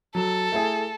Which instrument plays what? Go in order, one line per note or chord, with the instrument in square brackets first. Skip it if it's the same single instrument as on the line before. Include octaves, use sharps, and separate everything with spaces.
[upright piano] F#3 [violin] A4
[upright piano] A3 E4 G#4